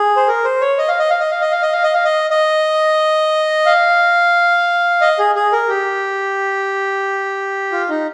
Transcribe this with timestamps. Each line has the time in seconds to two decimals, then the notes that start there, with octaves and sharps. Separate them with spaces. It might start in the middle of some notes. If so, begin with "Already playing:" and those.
Already playing: G#4
0.16 C5
0.28 A#4
0.44 C5
0.61 C#5
0.78 D#5
0.88 F5
0.99 D#5
1.10 F5
1.20 D#5
1.31 F5
1.42 D#5
1.52 F5
1.62 D#5
1.73 F5
1.83 D#5
1.94 F5
2.05 D#5
2.30 D#5
3.66 F5
5.01 D#5
5.19 G#4
5.35 G#4
5.52 A#4
5.69 G4
7.72 F4
7.89 D#4